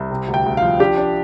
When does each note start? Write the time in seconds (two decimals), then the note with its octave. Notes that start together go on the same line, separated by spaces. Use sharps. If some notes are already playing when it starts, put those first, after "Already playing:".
Already playing: C2
0.11 C3
0.28 D2
0.34 G5
0.46 D2
0.57 F5
0.62 F3
0.79 D4 G4
0.98 D4